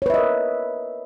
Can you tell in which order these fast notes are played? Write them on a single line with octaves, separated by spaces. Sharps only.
C#5 B4 E5 D#5 A#4